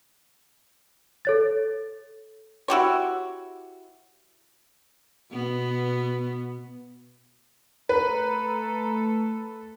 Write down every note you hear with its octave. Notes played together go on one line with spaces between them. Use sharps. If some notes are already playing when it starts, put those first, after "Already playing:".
A4 C#5 A6
E4 F#4 G4 C#5
B2 B3
A3 A4 B4 A#5